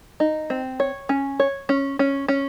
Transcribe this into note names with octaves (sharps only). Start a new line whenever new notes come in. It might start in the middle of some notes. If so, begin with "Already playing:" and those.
D#4
C4
C#5
C#4
C#5
C#4
C#4
C#4